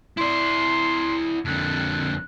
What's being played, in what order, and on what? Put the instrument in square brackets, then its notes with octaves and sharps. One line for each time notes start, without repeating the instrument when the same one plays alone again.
[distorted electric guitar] E4 D5 [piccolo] C6
[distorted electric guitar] F2 D3 [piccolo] F#6